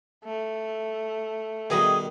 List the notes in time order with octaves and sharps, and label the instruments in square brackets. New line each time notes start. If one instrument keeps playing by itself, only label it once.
[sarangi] A3
[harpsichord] B2 D#3 G3 [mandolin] G#4 D#5